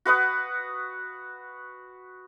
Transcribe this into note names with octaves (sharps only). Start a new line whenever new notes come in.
F#4 B4 F#5 D#6